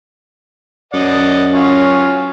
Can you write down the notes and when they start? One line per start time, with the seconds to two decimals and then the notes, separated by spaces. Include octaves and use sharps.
0.93 F#2 D5 D#5 F#5
1.53 F#3 C#4 F4